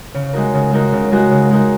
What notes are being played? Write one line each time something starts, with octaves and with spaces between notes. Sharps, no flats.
C#3
G#3 D#4 F#4 A#4
C#3
G#3 D#4 F#4 A#4
C#3
G#3 D#4 F#4 A#4
C#3
G#3 D#4 F#4 A#4